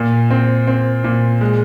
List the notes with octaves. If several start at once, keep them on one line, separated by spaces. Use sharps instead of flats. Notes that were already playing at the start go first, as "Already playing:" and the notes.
Already playing: A#2
C4
C4
A#2
G#3